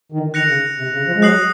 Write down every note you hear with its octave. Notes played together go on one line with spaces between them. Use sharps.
D#3
D#3 F#6 A#6 C#7 F7
C#3
C3
C#3
F3
G#3
F#3 D#6 F#6 C7 F#7